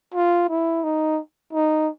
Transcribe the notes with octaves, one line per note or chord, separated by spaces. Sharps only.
F4
E4
D#4
D#4